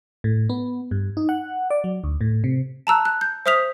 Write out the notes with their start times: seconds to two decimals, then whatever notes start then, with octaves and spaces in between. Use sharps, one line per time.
0.24 A2
0.49 B3
0.91 G2
1.17 D#4
1.29 F#5
1.70 D5
1.84 F#3
2.04 D2
2.21 A2
2.44 C3
2.87 A5 A#5 E6 F#6
3.05 F#6
3.21 G6
3.46 C5 E5 D#6 F6 B6 F7